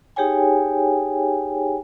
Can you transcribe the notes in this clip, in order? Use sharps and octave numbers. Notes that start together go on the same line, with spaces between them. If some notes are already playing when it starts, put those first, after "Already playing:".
D#4 G4 G#4 C#5 G5 G#5